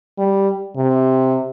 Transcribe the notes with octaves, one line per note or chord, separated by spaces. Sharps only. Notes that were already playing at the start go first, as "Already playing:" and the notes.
G3
C3